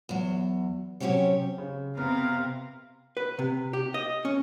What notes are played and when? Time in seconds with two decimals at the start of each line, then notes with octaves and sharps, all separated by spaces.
0.09 E2 F#3
1.00 C3 D#3 F#3 C#4 G4 C#5
1.58 C#3
1.97 C3 B3 A#4 F5 A#5
3.17 B4
3.39 C3
3.73 G4
3.94 D#5
4.25 C#4